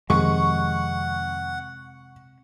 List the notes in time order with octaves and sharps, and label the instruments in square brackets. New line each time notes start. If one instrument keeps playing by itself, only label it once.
[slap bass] F2 D#3 [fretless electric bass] C3 G#3 [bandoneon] F#5 [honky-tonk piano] C#6